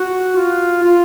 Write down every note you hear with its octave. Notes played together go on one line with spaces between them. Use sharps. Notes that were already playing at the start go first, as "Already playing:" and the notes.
Already playing: F#4
F4
F4